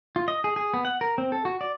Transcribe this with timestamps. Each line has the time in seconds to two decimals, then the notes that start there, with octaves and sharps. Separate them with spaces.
0.16 F4
0.28 D#5
0.44 G#4
0.56 G#4
0.74 B3
0.85 F#5
1.01 A#4
1.18 C4
1.32 A4
1.45 F#4
1.61 D5